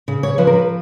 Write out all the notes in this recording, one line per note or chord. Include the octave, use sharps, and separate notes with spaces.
C#3
C#5
F3 B4
A#4
B4